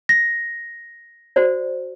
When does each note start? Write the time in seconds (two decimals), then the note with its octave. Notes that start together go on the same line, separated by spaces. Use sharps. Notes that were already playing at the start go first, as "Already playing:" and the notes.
0.09 A#6
1.36 F#4 C5 D5